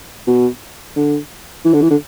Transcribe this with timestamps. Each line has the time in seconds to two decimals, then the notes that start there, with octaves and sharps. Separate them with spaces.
0.27 B2
0.96 D3
1.65 E3
1.73 D3
1.82 E3
1.91 D3